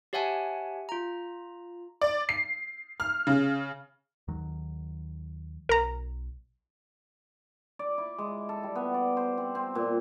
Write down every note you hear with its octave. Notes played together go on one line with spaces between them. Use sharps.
G4 C#5 E5 F#5 G#5 A5
F4 A#5
D5
C7
F6
C#3
D#2 D#3 F#3
B1 A#4 A#5
D5
E4
G#3
A4
G3
B3
D5
C5
C4
C4
A#2